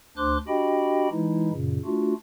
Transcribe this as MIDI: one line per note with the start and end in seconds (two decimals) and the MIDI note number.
0.17 0.37 38
0.17 0.37 62
0.17 0.37 72
0.17 0.37 84
0.17 0.37 86
0.17 0.37 90
0.47 1.08 62
0.47 1.08 66
0.47 1.08 67
0.47 1.08 75
0.47 1.08 79
0.47 1.08 83
1.11 1.51 52
1.11 1.51 56
1.11 1.51 63
1.11 1.51 64
1.51 1.78 42
1.51 1.78 46
1.51 1.78 49
1.85 2.14 57
1.85 2.14 62
1.85 2.14 65
1.85 2.14 66